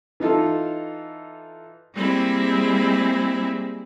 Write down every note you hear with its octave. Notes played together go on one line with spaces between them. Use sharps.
E3 D#4 F4 A4
G3 G#3 A#3 C4 E4 G#4